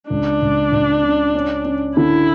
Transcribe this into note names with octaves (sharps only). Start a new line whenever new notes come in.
C#2 D4
C#2
C#2
C#3
C#4
C#4
D3 E4